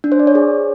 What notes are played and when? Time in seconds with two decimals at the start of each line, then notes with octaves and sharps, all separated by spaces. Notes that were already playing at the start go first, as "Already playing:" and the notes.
0.04 D4
0.12 C5
0.20 D5
0.27 C#5
0.35 G#4